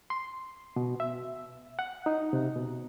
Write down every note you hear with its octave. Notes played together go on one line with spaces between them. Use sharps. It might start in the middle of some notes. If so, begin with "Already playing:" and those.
C6
B2
E5
F#5
D#4
C3
B2